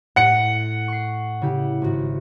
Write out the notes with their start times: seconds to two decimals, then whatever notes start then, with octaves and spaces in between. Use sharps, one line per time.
0.16 A2 F#5 C#7
0.88 C#6 C7
1.42 C#3 E4 G4
1.82 G#1 F#4